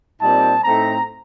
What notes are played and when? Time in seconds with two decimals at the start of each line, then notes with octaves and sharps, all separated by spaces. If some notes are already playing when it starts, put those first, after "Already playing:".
0.19 A#2 G3 C4 D#4 A5
0.63 A2 A3 C4 D#4 A#5